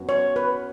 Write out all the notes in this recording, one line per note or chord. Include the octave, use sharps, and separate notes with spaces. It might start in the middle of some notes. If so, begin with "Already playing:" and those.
Already playing: F#2 F#3 B3
C#5
B4